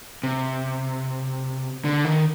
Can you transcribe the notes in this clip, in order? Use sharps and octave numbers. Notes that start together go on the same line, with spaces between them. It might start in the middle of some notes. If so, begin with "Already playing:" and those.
C3
D3
D#3